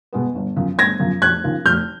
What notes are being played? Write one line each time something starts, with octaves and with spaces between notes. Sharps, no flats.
B2 G#3 B3
G1
F#2 C#3 F3
G1 G#6 A#6
F#2 C#3 F3
F1 F#6 G#6
D#2 C#3 F3
F1 F6 G6